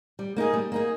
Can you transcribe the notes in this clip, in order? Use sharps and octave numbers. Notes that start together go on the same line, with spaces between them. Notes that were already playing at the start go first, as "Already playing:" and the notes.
G3
A#3 D#4 G#4
G3
A#3 D#4 G#4